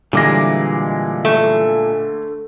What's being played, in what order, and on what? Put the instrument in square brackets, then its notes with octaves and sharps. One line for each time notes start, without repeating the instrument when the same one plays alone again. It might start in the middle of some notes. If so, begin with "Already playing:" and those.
[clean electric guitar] A#2 G#3 [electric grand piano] D3 D6 A#6 [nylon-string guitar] E3 G3
[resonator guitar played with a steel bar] A3